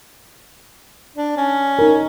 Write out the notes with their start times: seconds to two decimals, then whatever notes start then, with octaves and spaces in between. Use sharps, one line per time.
1.16 D4
1.37 C#4
1.79 D#4 A#4